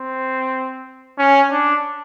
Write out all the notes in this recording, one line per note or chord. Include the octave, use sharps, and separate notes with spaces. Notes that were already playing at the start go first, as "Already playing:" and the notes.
Already playing: C4
C#4
D4